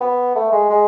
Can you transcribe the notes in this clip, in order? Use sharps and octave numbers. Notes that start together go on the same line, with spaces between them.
B3
A3
G#3
G#3